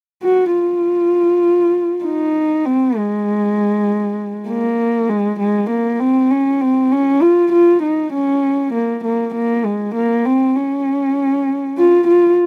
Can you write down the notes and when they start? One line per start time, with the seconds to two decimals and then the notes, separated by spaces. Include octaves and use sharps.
0.23 F#4
0.53 F4
2.05 D#4
2.66 C4
2.97 G#3
4.48 A#3
5.09 G#3
5.40 G#3
5.71 A#3
6.00 C4
6.31 C#4
6.61 C4
6.92 C#4
7.22 F4
7.53 F4
7.83 D#4
8.14 C#4
8.74 A#3
9.04 A#3
9.35 A#3
9.65 G#3
9.95 A#3
10.26 C4
10.56 C#4
11.78 F4
12.08 F4